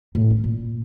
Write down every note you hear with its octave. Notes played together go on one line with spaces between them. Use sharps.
A2
C#4
A#2